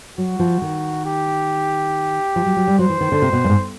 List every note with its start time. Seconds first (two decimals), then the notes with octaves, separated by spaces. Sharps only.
0.17 F#3 F#4
0.39 F3
0.62 D#3
1.05 G4
2.36 F3
2.46 F#3
2.56 F#3
2.67 G3
2.79 F#3 C5
2.90 E3
3.01 D#3
3.12 D3
3.22 C3
3.33 B2
3.44 F#2
3.49 G#2